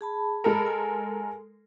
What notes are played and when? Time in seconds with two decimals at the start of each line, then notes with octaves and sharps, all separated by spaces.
0.01 G#4 A5 B5
0.44 G#3 A4 A#4
0.66 G#5